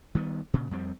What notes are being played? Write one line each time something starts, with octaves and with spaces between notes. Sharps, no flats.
D#3 G3 B3
A#2 C#3
F2 G3 C4